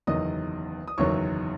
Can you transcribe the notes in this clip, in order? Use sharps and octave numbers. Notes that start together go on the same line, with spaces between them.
F#1 E2 D#3 F#3 D#5 D#6
D#6
F#1 E2 D#3 F#3 C#5 C#6